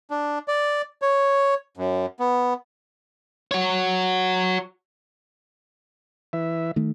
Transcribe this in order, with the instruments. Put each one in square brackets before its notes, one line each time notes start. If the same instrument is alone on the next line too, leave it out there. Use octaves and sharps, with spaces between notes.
[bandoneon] D4
D5
C#5
F#2
B3
[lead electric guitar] F#4 C#5
[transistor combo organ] E3 E5
[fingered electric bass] D#3 A3